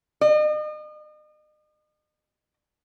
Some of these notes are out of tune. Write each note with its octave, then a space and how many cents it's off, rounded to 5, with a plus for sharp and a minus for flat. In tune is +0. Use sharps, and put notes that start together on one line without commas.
D#5 -40